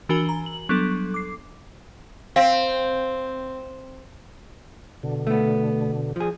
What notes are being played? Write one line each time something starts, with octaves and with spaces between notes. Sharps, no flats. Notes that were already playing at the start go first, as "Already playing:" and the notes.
E3 D4 F#4 A#4 G#5 G7
A#5
F#7
F#3 G3 B3 D4 A4
D6 C7
C4 F5
B2 D3
A3 B3
F3 G#4